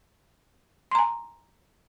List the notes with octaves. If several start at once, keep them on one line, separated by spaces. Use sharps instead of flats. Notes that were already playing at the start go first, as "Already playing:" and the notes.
G#5 A#5 C6